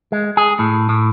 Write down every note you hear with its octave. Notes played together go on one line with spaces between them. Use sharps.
G#3
G#4
A2
A2